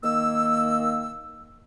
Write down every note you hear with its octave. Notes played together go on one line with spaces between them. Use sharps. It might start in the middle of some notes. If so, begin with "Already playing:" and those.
D#3 A#3 E6